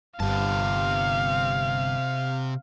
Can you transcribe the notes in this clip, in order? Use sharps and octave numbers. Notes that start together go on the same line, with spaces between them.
G1 G2 C3 F5 A5